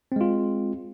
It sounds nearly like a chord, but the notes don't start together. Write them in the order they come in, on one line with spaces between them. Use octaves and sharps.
C4 G#3 F4